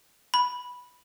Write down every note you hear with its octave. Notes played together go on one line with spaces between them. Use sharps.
B5